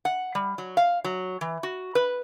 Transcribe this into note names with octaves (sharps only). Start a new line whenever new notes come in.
F#5
G3
F#3
F5
F#3
E3
F#4
B4